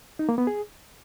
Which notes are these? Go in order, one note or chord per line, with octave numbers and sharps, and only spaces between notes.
D#4
A#3
B3
G#4